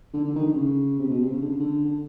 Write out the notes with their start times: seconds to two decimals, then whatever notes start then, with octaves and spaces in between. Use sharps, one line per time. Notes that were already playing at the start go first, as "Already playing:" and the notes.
0.13 D3
0.25 D3
0.35 D#3
0.46 D3
0.56 C#3
0.99 C3
1.10 B2
1.21 C3
1.32 C#3
1.42 D3
1.51 C#3
1.60 D3
1.85 D3